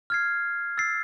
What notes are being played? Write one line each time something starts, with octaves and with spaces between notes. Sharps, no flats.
F6 G#6 C7
E6 A6 C7